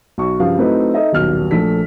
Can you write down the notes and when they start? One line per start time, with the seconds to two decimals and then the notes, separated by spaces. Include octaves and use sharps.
0.18 B1 C#6
0.40 G2 C#3 F3 F5
0.58 F#3 A3 C4 D#4 E4 B4
0.94 D#4 A4 D#5 E5
1.12 D#1 B1 F6
1.51 A#1 F3 A3 A4 B6